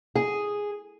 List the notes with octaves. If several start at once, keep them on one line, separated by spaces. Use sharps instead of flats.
G#4